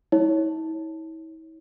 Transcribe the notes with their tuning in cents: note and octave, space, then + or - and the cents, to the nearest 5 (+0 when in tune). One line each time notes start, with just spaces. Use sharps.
E4 -40 C#5 +0